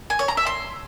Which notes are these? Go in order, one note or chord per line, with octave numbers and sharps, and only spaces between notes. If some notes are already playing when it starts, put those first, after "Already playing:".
G#5
C#5
A#5
E5
C6